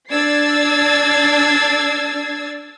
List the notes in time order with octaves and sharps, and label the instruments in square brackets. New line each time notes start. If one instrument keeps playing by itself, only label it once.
[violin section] D4 D5 E6 G#6 A6 C7